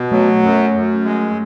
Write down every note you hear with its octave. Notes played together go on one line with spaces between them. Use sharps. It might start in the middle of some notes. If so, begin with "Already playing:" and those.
Already playing: B2
F#3 A3
F#2
F#2
G#3